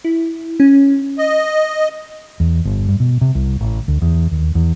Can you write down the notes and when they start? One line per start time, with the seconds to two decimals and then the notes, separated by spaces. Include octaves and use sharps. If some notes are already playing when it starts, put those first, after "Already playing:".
0.04 E4
0.60 C#4
1.18 D#5
2.40 E2
2.65 G1
2.89 G2
3.00 B2
3.21 C3
3.35 C2
3.60 A1
3.88 D2
4.02 E2
4.31 D#2
4.55 E2